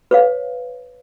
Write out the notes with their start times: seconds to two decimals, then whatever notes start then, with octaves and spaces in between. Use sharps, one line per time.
0.11 B4 C#5 F5